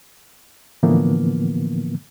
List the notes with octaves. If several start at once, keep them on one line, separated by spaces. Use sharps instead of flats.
A2 D3 E3 F3 A#3 B3